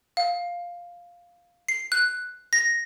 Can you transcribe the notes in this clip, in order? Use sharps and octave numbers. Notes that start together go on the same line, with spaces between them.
F5
C7
F#6
A#6